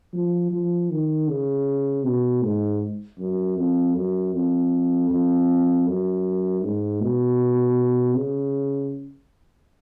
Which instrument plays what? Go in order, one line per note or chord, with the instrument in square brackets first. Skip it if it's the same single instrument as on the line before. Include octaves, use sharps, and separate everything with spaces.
[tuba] F3
F3
D#3
C#3
B2
G#2
F#2
F2
F#2
F2
F2
F#2
G#2
B2
C#3